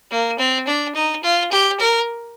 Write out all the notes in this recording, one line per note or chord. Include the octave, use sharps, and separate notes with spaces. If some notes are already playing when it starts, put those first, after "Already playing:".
A#3
C4
D4
D#4
F4
G4
A#4